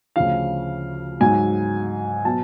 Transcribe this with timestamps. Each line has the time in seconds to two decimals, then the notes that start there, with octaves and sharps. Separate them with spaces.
0.16 D2 C#3 F3 F5
1.20 G#2 F#3 G#5
2.25 B2 F#3 A5